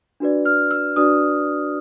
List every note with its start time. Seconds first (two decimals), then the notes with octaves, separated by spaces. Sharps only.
0.20 D4 F#4 B4 D5
0.45 F6
0.71 E6
0.96 D4 F#4 B4 D5 D#6